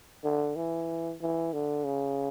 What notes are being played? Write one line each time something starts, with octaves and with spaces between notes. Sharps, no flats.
D3
E3
E3
D3
C#3